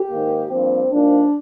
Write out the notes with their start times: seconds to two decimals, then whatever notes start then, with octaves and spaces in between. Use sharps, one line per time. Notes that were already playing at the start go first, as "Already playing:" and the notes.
Already playing: G4
0.09 G#2 D#3 A#3
0.49 G2 F3 A#3 C4
0.90 G#2 F3 A#3 D4